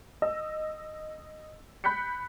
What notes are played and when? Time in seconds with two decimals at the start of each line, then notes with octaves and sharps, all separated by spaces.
0.22 D#5 E6
1.84 B5 F#6 G6 B6 C#7